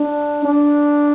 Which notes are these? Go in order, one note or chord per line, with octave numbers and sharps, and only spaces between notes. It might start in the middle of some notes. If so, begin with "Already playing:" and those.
Already playing: D4
D4